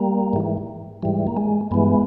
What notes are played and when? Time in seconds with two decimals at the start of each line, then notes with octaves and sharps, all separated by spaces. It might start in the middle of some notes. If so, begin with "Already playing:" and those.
Already playing: G3 A#3
0.33 G#2 E3
1.02 G#2 E3 G3
1.27 A#3
1.37 G#3
1.71 G2 E3 G#3 B3